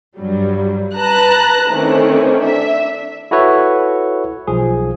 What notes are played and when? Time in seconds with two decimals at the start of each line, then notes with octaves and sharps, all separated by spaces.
0.16 G2 F#3 G3
0.95 B4 A5 A#5 F#6
1.69 D#3 E3 A3 C4 C#4
2.42 D4 E5
3.31 E4 F#4 A4 B4 C#5 E5
4.47 B1 F3 G#4